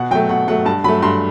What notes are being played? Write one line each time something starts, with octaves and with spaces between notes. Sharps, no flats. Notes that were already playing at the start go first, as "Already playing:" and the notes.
Already playing: B2 F#5
F#3 A3 G5
B2 F#5
F#3 A3 F#5
G2 A5
F#3 A3 B5
G2 C6